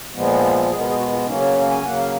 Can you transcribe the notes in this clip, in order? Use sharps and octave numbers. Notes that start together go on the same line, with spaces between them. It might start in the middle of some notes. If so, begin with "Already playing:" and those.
A#2 F3 G#3 B3
B2 G#3 B3 G#4
A#4
G#4
F#4
F4
C#3 F#3 A#3 C#4 D#4
C#5
G#5
C#3 F#3 A#3 F#5
F5